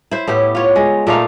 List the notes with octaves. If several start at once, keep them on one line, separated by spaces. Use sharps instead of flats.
E4 C5
A2 B3 G4
F4 C#5
G#3
A#2 A3 D#4 F5